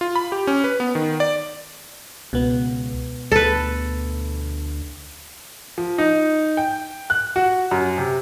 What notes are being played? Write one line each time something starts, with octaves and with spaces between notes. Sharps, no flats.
F4
B5
G4
C#4
B4
B3
D#3
D5
C#2 B2 B3
D2 A4 B4
F3
D#4
G5
F#6
F#4
F#2
C3